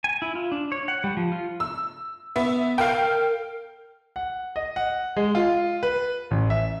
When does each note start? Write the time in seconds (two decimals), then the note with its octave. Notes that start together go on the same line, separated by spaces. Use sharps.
0.04 G#5
0.22 E4
0.35 F4
0.52 D4
0.72 C#5
0.88 F#5
1.04 G3
1.17 F3
1.32 F4
1.60 E6
2.36 B3 E5
2.78 A#4 F5 G5
4.16 F#5
4.56 D#5
4.76 F#5
5.16 G#3
5.35 F4
5.83 B4
6.31 A1
6.50 E5